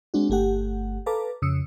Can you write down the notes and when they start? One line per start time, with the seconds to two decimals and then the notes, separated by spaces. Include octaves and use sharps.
0.14 G#3 C4 D4 F#4
0.30 G1 A3 G4 F#5
1.06 A4 B4 F5 A5 A#5 D6
1.42 F2 C#3 D#6 E6 C#7